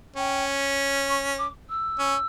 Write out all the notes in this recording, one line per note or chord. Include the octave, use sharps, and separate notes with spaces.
C#4 G5
C#6
D6
E6
C#4